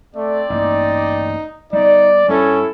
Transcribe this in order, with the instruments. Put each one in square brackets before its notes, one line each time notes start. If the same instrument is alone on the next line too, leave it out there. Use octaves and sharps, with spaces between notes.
[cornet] A3 [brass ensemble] C4 D5
[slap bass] A1 G2 A#3 [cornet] D#4
[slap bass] G3 B3 [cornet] D#4 [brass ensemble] D5
[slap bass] G2 G3 [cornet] C#4 [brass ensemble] E4 A4